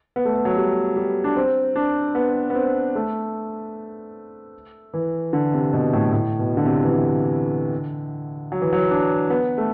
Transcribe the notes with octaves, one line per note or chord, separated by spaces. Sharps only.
B3
A3
B3
F#3
G3
G3
D4
C4
D4
B3
B3
C4
A3
E3
D3
C3
B2
A2
A2
B2
D3
C3
E3
D3
F#3
E3
F#3
D4
B3
A3